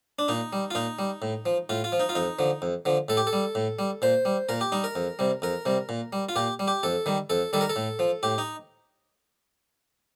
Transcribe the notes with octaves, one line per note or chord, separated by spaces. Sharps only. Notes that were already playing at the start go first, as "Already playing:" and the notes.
D4
A#2 D#4
G3
F4
A#2 D#4
G3
A2
F3
A2 F4
F4
F3
D#4
F4
F2 D#4
D3 F3
F2
D3 F3
A2 A4
G4
A4
G3
A2
G3
A#2 C5
G3
A#2 A#4
G4
G3 D#4
A#4
F2
C3 G3
F2 A#4
C3 G3
A#2
G3
F4
A#2 G4
G3
G4
F2 A4
D#3 G3
F2 A4
D#3 G3 A4
A#4
A4
A2
F3
A2 G4
D#4